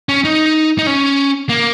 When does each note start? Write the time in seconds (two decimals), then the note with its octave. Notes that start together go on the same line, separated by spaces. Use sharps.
0.09 C#4
0.25 D#4
0.78 D#4
0.87 C#4
1.49 A#3